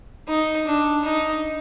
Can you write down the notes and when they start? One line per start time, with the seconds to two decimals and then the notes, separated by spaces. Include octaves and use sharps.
0.28 D#4
0.67 D4
1.04 D#4